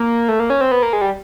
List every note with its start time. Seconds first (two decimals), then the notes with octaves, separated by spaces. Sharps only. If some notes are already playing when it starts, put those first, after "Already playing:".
Already playing: A#3
0.29 A3
0.40 A#3
0.50 C#4
0.61 C4
0.71 B3
0.82 A#3
0.93 G#3
1.01 G3